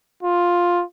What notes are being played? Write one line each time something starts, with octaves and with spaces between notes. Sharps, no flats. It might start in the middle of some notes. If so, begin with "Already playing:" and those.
F4